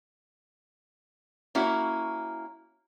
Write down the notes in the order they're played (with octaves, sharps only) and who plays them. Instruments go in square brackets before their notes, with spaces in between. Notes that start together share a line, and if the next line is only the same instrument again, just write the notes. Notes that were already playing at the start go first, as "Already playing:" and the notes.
[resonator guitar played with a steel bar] A#3 C#4 E4 F#4